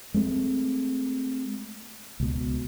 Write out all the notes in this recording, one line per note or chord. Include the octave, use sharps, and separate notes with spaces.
G#3 A3 B3 C4
C#2 B2